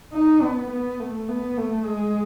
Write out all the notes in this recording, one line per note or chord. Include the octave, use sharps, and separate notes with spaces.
D#4
B3
B3
A3
B3
A3
G#3